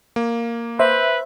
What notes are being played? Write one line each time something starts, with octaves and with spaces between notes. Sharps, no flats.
A#3
B4 C5 E5